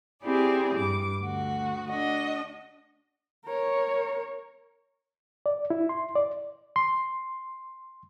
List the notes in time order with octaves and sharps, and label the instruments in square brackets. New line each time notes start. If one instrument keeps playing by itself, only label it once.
[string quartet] C4 E4 G4 G#4 D5
G2 D6
D2 F#4
D4 F#4 D#5
[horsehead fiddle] A#4 C#5
[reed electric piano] D5
E4
C6
D5
C6